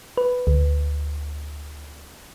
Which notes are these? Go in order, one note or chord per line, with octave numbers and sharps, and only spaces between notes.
B4
D2